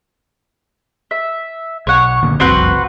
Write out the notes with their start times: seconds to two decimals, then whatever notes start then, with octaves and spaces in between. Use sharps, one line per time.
1.11 E5
1.87 B1 C#5 F#5
2.23 D#2 A#2 D3
2.40 F#1 C2 F2 C4 F#4 B4